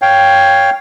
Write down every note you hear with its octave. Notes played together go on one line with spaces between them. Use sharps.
C#5 F5 G5